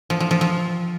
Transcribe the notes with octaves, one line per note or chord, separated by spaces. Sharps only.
F3
F3
F3
F3